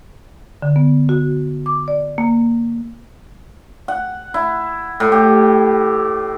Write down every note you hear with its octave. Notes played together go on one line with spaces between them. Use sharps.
D3
B3
F#4
D6
D5
A#3
F#5
E4
A2
G4